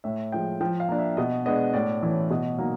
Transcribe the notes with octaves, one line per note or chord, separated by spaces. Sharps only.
A2 E5
F3 G#3 G5
F3 G5
F5
A#3 D4
E5
B2 D#5
G#3 B3 D4 D#5
A2 D5
E3 A3 C#4
B2 D#5
F#3 A#3 D#4